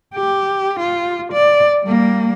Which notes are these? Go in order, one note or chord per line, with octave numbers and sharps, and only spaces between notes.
G4
F4
D5
G3 A#3